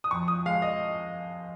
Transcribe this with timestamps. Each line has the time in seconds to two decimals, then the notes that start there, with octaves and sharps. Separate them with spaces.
0.04 D#6
0.11 F2 C#6
0.28 D#6
0.46 G#3 F5
0.62 D#5